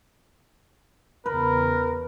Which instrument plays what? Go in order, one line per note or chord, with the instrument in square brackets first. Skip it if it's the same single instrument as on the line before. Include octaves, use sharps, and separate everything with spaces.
[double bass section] E2 C#3 [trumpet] A#4 [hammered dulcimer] B4